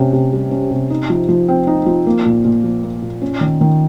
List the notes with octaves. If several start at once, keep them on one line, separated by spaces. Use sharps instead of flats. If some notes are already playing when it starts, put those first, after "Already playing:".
Already playing: C3 C#4
C3
G3
C#4
C3
D#4
F3
F3
C4
D#4
F3
A#3
A#2
A#2
F3
A#3
A#2
C#4
D#3
D#3